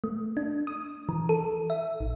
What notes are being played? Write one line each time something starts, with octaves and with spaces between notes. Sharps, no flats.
A3
D4
D#6
E3
A4
E5
A1